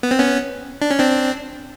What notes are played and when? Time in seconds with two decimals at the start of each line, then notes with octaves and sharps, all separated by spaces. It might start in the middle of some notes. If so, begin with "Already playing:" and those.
0.03 B3
0.11 C4
0.19 B3 C#4
0.82 D4
0.91 C#4
0.99 C4 D4